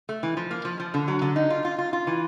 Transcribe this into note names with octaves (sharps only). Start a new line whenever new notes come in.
A3
E3
F3
A#3
F3
F3
D3
F#3
D3
D#4
F4
F4
F4
F4
E3